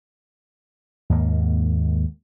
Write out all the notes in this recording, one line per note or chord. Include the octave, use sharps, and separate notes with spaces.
D#2 G#2 A#3